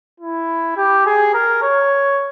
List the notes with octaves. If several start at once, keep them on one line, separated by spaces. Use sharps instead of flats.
E4
G4
G#4
A#4
C#5